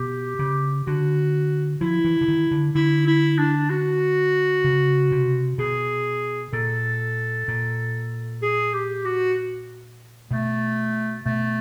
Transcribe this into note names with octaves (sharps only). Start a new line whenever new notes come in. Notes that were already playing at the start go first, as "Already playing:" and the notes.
Already playing: B2 G4
C#3
D3 F#4
F3 E4
E3
D3
D#3
D3
D3 E4
E4
D4
F#4
C#3
C3
B2 G#4
A#2 A4
A#2
G#4
G4
F#4
B2 A3
B2 A3